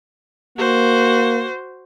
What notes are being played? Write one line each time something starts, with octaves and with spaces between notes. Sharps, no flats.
A#3 F#4 C5